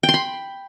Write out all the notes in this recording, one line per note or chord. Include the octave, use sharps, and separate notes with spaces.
G5
C6
B5